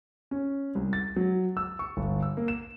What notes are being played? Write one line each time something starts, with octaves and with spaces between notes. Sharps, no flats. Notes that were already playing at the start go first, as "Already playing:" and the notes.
C#4
C2
A6
F#3
E6
C#6
G1
E6
A#3
E7